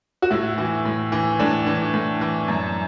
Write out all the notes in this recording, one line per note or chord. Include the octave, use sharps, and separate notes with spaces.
F#4
A2 E4
E3
A2
E3
A2 D4
E3
A2
E3
F#2